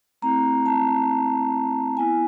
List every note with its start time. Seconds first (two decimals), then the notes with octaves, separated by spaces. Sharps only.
0.22 A3 C4 E4 A#5
0.66 A5
1.97 B3 G#5
1.99 E4